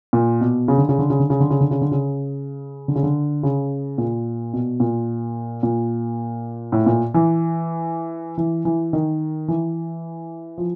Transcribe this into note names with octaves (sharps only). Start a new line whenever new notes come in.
A#2
B2
C#3
D3
C#3
D3
C#3
D3
C#3
D3
C#3
D3
C#3
D3
C#3
D3
C#3
D3
C#3
A#2
B2
A#2
A#2
A2
A#2
E3
E3
E3
D#3
E3
F3